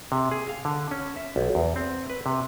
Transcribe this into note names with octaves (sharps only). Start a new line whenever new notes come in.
C3
G#4
F5
D3
C#4
E5
B1
E2
C4
B4
C3